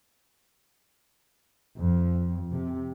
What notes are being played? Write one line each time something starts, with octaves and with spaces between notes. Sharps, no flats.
F2
C3